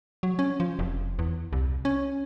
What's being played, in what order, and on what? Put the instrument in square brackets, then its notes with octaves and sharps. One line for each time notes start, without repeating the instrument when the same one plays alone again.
[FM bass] F#3
C#4
F3
F1
E2
C2
C#4